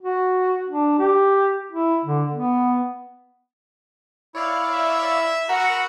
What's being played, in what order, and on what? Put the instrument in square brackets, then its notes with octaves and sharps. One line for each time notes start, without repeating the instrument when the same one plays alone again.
[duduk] F#4
D4
G4
E4
D3
B3
[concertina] E4 [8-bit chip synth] C#5 D5 F5
[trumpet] E5
[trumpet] F#4 [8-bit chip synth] A#4 B5 E6 [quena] F#5 [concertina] A#5